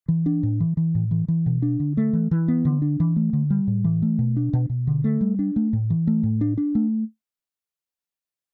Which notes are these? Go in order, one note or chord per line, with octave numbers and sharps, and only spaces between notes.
E3
D4
A2
E3
E3
A2
E3
E3
B2
D4
D3
A3
E3
E3
B3
D3
D4
E3
A3
D3
G3
A2
E3
A3
B2
D4
B2
B2
D3
A3
G3
D4
A3
A2
E3
A3
A2
D4
D4
A3